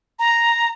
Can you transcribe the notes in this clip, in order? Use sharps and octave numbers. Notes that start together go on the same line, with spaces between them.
A#5